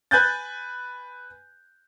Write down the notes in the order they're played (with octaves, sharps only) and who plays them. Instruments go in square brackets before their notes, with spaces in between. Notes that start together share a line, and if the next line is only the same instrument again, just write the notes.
[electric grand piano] B4 G#5 F#6 G6 A6